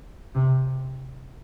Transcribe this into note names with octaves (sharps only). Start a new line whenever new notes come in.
C3